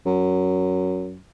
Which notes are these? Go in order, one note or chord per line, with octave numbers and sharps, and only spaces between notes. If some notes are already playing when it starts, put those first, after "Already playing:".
F#2